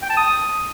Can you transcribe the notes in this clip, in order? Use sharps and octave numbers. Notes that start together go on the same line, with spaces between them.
G5
A5
D#6